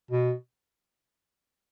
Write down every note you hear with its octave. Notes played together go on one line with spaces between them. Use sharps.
B2